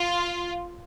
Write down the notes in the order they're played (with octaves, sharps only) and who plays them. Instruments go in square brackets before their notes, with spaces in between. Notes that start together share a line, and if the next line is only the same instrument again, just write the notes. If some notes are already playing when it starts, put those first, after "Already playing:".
Already playing: [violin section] F4